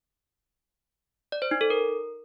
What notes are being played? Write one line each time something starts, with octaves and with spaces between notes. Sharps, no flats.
D5
C5
D#4
A4
A#4